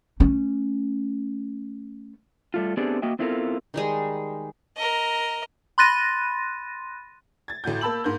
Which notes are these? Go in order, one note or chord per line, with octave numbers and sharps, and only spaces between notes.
A3 C#4
G3 A3 F4
A3 B3 C4 D4 G4 G#4
A#3 F#4 D#5 E5 G5
B3 C4 E4 F4 A4 A#4
D#3 G3 G#3
A#4 D#5
B5 C6 F#6 A6 A#6 D#7
G#6 A6
A1 A2 F#4 G6
A#3 A5 B5 E6 F#7
G#2 A#3 G6